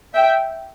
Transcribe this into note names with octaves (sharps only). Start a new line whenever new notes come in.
E5 G5